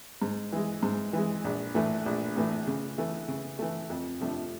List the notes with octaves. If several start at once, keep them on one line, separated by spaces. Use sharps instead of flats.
G#2
E3 G#3
G#2
E3 G#3
A#1
A2 E3 A3
A#1
A2 E3 A3
C#3
E3 A3
C#3
E3 A3
F2
C3 F3 A3 D4